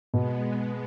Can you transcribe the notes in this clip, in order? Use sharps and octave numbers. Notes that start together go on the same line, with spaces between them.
B2 G#3 B3